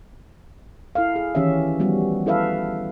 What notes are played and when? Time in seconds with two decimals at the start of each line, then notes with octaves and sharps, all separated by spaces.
0.95 E4 A4 F5
1.16 G#4
1.35 D#3 E3 C#4 G4 E5
1.80 F3 G3 B3 F#4
2.26 E4 A4 B4 E5 F5